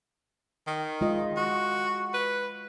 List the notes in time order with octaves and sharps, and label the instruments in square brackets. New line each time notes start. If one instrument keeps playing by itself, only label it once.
[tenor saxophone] D#3
[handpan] G#3 F4 D#5
[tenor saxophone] F#4
B4